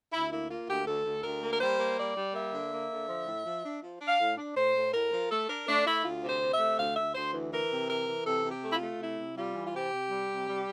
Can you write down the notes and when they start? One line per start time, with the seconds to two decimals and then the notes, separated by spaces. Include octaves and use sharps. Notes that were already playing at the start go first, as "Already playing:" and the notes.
0.12 D2 E4
0.31 A#3 E4
0.49 A#3 F4
0.68 D2 G4
0.86 D2 A4
1.05 D2
1.23 D2 A#4
1.42 A#3
1.53 A#4
1.60 G3 C5
1.79 A#3
1.97 G3 D5
2.16 G3
2.34 A#3 E5
2.52 D3
2.72 A#3
2.90 D3
3.09 F3
3.26 A2
3.45 F3
3.64 D4
3.82 F3
4.01 D4
4.07 F5
4.19 A2
4.37 D4
4.56 A2 C5
4.75 A2
4.93 A2 A#4
5.12 F3
5.31 A3 A4
5.48 D4 A#4
5.67 A3 D4
5.85 A3 E4
6.04 D2 F4
6.22 C3
6.28 C5
6.41 C3
6.53 E5
6.59 A3
6.78 D2 F5
6.96 D2 E5
7.15 D2 C5
7.33 E3
7.51 E3 A#4
7.71 C3
7.88 E3 A#4
8.07 E3
8.26 C3 A4
8.45 C3
8.50 G4
8.63 A3
8.70 E4
8.75 F4
8.81 A3
8.99 C3 E4
9.18 C3
9.37 G3 F4
9.55 E3
9.66 F4
9.73 C3 G4
9.92 C3
10.10 G3
10.29 C3
10.47 G3